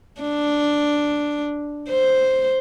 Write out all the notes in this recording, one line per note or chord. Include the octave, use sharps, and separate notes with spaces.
D4
C5